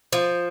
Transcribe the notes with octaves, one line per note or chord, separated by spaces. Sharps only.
F3